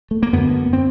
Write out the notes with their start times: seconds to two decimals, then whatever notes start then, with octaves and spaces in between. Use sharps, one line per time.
0.11 A3
0.23 A#3
0.33 F#2 D3 B3
0.73 C4